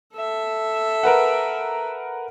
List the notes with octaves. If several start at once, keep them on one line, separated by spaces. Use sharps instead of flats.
A4 E5
A#4 B4 F#5